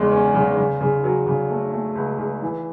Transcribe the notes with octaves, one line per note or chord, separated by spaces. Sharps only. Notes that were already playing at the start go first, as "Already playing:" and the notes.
Already playing: E2 C#3 G#3
C#4
C#3
C#3
C#3
F#3
C#3
A3
A3
C#2
C#2
E3